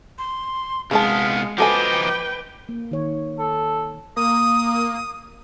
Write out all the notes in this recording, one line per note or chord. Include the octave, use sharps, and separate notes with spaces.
C6
C2 C#3 G#3 B3 C#4 F5 A5
F3 D#4 F#4 A4 B4 G5 G#5 D6
A#3
D#3 C#5
A4
A#3 D#6